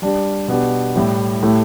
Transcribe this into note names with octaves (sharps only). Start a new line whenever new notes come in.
G3 D4 G4
B2 B3 D4 G4
A2 G3 E4 G4
A2 A3 E4 G4